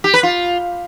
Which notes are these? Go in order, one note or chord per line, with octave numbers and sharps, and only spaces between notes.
G4
B4
F4